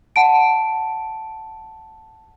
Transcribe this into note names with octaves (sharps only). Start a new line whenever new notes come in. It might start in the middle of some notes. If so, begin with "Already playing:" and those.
F#5 A5 D7